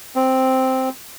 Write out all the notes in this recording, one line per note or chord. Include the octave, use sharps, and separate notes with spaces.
C4